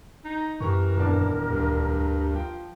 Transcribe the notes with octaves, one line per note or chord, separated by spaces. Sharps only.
D#4
F#2 E3 G4 A#4 A#5 C#6
D#1 E2 D4
D2 G2
F3 G5